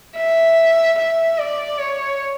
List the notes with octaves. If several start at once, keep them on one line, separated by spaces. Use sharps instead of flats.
E5
E5
D5
C#5